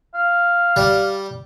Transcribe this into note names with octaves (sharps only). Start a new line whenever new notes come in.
F5
G3